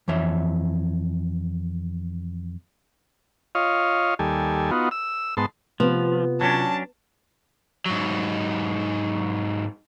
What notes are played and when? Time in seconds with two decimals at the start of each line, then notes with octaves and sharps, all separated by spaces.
0.08 F2 E3 C#5 E5
3.55 F4 C#5 D#5 F5
4.19 D#2 G3 A4 G#5
4.71 B3 D#4 F4 F#4
4.91 E6
5.37 G#2 B3 A5 C6
5.80 C3 F3 B3 F4
6.41 F#3 C#4 D4 A5
7.86 G#2 F#3